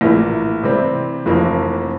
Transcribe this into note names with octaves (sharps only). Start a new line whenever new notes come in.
A#1 A2 E3 A#3 E4
C3 E3 G3 C4
F1 F2 E3 A#3